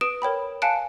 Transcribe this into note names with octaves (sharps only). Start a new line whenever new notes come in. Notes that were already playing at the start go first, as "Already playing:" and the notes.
B4 D#6 D7 E7
A#4 C#5 G5 B5
F5 G#5 A5 F#6 C#7 D7